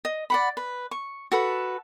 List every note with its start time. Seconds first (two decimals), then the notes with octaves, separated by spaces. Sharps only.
0.05 D#5
0.30 D5 F#5 B5
0.57 B4
0.91 C#6
1.32 F#4 A4 B4